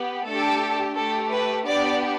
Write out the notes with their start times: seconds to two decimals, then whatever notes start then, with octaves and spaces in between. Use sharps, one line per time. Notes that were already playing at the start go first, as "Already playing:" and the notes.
Already playing: B3 G4
0.26 A3 D4 G4 A4
0.95 A3 G4 A4
1.31 B4
1.65 B3 D4 G4 D5